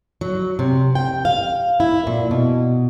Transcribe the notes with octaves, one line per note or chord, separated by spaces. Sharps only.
F#3
C3
G5
F5
E4
A#2
B2